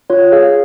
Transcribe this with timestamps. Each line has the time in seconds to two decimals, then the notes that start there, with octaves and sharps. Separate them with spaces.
0.10 F4 C#5
0.32 G#4 F5